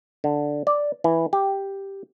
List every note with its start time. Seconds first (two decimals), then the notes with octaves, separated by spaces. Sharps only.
0.24 D3
0.67 D5
1.04 E3
1.33 G4